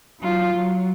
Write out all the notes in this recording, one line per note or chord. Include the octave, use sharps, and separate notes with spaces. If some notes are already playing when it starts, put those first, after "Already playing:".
F#3 F4
F#3